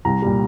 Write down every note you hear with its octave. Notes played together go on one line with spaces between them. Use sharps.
C2 A#5
A#2 G3